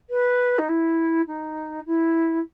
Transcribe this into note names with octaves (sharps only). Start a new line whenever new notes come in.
B4
D#4
E4
D#4
E4